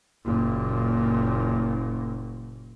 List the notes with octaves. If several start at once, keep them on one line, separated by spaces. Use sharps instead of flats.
F#1 A#2